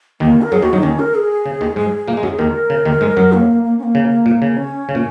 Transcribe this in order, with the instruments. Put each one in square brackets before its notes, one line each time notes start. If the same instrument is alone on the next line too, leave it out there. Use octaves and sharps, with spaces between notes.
[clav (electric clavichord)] D#2 D#3 [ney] A#3
[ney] A#4
[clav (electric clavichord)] F#2 F#3 [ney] G#4
[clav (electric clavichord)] D#2 D#3 [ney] F#4
[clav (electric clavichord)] F#2 F#3 [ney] D#4
[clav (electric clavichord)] D#2 D#3 [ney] C#4
[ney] A#4
G#4
[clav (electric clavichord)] C#3
D#2 D#3
[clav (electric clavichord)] G#2 G#3 [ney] G#4
[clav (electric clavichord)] A#2 A#3
G#3
F#2 F#3
[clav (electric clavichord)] D#2 D#3 [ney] A#4
[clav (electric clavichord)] C#3
D#2 D#3
G#2 G#3
F#2 F#3
[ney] A#3
A#3
C#4
A#3
[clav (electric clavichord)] C#3
A#2
C#3
[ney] C#4
[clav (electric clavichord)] C#3
A#2